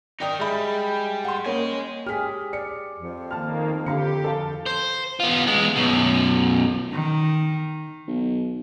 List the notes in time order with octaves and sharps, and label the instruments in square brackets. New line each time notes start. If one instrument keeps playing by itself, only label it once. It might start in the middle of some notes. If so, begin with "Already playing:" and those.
[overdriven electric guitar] D#4 A#4 [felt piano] D5 G5 D#6
[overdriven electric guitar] G3 [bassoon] G#3 [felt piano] E5 B5
[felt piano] F#5 C6
[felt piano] A#3 [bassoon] C#4 [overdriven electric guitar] D#5 G#5
[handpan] G4 G#4 [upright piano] F6 B6
[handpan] D5 [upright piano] C#7
[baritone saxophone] F2
[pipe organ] D#3 A#3 [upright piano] A5 F6
[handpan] D3 [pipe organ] G4 [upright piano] F5 A#5 C#7
[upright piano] A4 F5 A5
[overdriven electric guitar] C5
B3 F4
G#3 B3
F#2 B2
[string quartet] D#3
[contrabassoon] B1